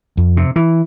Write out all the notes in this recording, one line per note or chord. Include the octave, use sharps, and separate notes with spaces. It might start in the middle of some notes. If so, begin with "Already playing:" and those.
F2
C3
E3